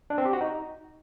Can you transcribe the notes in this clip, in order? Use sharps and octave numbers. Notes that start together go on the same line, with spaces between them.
D4
C4
G4
F#4
D#4